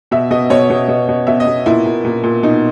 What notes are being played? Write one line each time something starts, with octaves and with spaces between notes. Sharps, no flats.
B2 E5
B2 D#5
B2 C#5
B2
B2
B2
B2 E5
D#5
B2
A#2 E4
A#2
A#2
A#2
B2 D#4